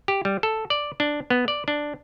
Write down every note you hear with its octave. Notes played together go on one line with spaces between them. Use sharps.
G4
G3
A4
D5
D4
B3
D5
D4